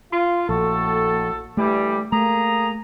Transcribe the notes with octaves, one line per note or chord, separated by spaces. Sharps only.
F4
A#1 A2 F#4 A4
D3 E3 G3 A3
A3 A#3 G#4 A#5